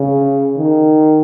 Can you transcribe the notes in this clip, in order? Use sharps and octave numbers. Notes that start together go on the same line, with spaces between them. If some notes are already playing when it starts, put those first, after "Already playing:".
Already playing: C#3
D#3